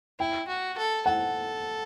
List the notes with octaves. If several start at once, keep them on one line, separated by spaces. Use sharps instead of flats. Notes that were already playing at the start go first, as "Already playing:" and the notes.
E4 G5
F#4
A4
A4 F#5